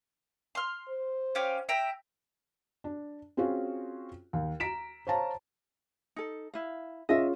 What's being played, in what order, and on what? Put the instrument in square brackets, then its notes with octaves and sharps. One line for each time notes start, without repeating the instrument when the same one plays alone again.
[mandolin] C6 F6
[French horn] C5
[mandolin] C#4 G4 F5
E5 G5 A#5
[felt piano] D4
C4 C#4 F4 F#4 G#4
D#2
A#5 B6 D7 E7
C5 C#5 F5 A5 A#5
[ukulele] D#4 A4
E4 F5
[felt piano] C#4 F4 G#4 [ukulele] D#5 E5